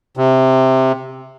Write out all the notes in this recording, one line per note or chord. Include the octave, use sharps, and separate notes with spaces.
C3